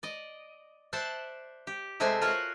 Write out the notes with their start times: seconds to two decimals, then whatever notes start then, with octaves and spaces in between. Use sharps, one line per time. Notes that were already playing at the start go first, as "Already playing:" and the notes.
0.03 D5 D#5
0.93 C5 D5 E5 F#5 A5
1.67 G4
2.00 C3 G#3 A3 C4 E5 G#5
2.21 F4 F#4 A#4 C#5 F#5